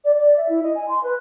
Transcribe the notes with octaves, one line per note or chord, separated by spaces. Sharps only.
D5
D5
E5
E4
D#5
G#5
C6
B4